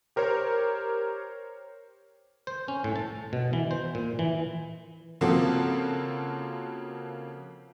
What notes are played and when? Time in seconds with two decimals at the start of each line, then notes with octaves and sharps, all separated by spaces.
0.16 G4 A#4 C5 C#5
2.47 C5
2.68 C#4
2.84 A2
2.96 A5
3.33 B2
3.53 E3
3.71 C5
3.95 A#2
4.19 E3
5.21 C#3 F3 A#3 C4 F#4 A4